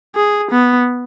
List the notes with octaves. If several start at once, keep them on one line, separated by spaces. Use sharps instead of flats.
G#4
B3